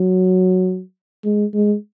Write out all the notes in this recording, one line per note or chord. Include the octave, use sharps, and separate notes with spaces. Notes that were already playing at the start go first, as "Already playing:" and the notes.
Already playing: F#3
G#3
G#3